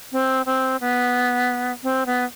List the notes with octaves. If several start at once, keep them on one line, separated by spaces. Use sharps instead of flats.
C4
C4
B3
C4
B3